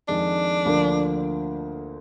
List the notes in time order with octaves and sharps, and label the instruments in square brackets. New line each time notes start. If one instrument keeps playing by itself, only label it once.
[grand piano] F2 D#3 G#3 [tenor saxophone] D4
[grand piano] D2 D3 F3 A#3